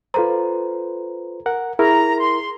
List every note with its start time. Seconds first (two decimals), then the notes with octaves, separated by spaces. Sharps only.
0.14 F4 A4 B4 C5 A#5
1.46 A#4 F#5
1.79 E4 G#4 A#4 A#5
2.18 C6